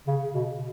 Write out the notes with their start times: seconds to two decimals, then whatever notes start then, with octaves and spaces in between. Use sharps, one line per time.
0.07 C#3
0.34 B2